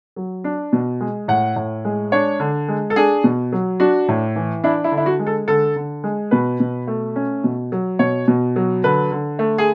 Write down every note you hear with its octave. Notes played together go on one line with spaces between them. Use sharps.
F#3
D4
B2
G#3
A2 F#5
A2
G#3
D4 C#5
D3
G#3
A4
D4 G#4
B2
F#3
D4 F#4
A2
E3
D4 E4
E4
D3
E4
F#4
G#3
A4
D3 A4
D3
G#3
B2 B4
B2
A3
C#4
B2
F#3
B2 C#5
B2
F#3
D3 B4
D3
A3
G#4